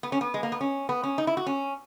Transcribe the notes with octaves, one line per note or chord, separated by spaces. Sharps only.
B3
C#4
B3
G#3
A#3
B3
C#4
B3
C#4
D#4
E4
F#4
C#4